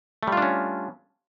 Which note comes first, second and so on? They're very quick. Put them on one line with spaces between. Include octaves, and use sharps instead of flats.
A3 G3 F4 D4 C#4